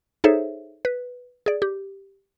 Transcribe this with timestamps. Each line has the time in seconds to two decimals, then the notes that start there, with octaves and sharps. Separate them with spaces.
0.24 D#4 G#4 A4 C5 C#5 E5
0.85 B4
1.46 G#4 D5
1.62 G4